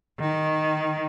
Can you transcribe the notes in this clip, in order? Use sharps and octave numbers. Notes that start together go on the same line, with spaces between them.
D#3